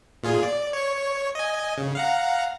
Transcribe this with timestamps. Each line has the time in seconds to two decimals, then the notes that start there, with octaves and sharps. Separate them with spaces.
0.23 A#2 F4 G#4
0.43 D5
0.73 C#5 C#6
1.35 D#5 G#5
1.78 C#3
1.95 F5 F#5 A#5